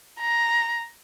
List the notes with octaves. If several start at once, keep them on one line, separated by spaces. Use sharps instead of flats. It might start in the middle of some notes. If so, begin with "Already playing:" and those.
A#5